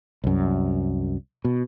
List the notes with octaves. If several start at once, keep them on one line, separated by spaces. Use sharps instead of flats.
C2 F#2
B2